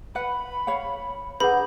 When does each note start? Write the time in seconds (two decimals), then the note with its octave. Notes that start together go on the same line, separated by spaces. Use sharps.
0.15 B4 F#5 B5
0.67 C#5 F5 F#5
1.40 D4 G#4 A#4 B4 F#5 B5 G6